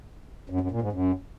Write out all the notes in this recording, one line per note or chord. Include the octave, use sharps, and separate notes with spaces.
F#2
F#2
A#2
G#2
F#2